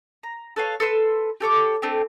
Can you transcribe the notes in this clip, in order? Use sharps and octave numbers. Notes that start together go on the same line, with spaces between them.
A#5
A4 B4 C#5 F5
A4 B4 C6 E6
G4 A4 C#5 D6
A3 C4 D4 G4